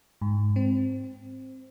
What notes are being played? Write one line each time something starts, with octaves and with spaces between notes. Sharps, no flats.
G#2
C4